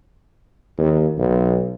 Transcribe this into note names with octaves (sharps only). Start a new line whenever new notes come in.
D#2
B1